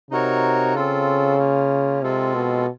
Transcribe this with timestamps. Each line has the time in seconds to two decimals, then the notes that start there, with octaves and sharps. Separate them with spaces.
0.11 C3 D#4 F#4 A#4 C#5
0.75 C#3 C4 F4 A4
1.38 A#3 C#4 F4
2.02 C3 G#3 C4 F4 A4
2.34 B2